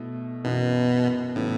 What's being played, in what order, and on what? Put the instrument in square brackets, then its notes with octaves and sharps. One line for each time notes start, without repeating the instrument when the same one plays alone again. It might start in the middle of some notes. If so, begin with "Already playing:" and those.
Already playing: [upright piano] B2 A3 E4
[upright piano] F#2 E3 B3 [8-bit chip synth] B2
[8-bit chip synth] A2 [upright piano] C#3 E3 B3